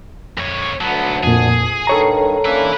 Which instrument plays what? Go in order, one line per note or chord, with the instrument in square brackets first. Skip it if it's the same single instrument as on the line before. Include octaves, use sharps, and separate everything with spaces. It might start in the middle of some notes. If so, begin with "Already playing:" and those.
[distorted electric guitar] F2 C#5
[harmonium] D2 D3 A5 [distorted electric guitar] F#3 B3
[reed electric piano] F2 A#2 [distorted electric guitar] G#4
[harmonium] G2 D#3 [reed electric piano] A4 C#5 A#5
[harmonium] A#3 C#4 D4 [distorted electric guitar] B4 E5